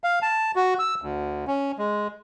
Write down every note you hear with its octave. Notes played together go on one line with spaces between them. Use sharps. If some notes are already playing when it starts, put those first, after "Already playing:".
F5
A5
F#4
E6
D2
C#4
G#3